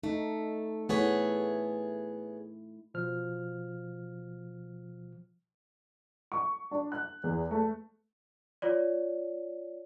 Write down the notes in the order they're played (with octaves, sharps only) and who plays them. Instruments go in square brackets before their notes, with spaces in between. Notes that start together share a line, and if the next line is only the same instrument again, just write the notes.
[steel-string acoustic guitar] A3 [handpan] D#4
[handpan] A3 E4 [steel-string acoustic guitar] B3 G#4 C#5
[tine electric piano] B2 F3 F6
[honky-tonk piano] C#6
D4
F#6
E2
A3
[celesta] F4 C#5 D5